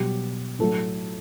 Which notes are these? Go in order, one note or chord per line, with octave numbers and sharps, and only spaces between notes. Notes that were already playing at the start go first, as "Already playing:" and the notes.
Already playing: B2 F#3 G3 G4
A2 F#3 A3 A4